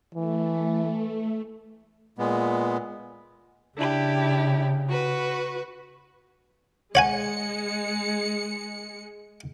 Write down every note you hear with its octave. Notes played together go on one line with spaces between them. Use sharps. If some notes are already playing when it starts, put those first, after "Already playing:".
E3 A3
A#2 G#3 B3
C#3 D4 E4 G4
F#4 B4 C#6
G#3 C#5 F#5 G#5 C#7